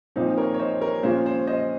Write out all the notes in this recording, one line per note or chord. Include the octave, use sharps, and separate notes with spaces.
A#2 F3 C4 D#4 C5
A#4 C#5
C#5
C5 D#5
A#4 C#5
A#2 F3 G#3 C#4 F4 C5
C5
C5 D#5